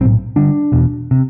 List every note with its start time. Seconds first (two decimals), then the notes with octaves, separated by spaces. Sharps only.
0.01 B1 C4
0.06 A2
0.36 G1 G2 D3 D4
0.72 E1 E2 B2
1.11 C3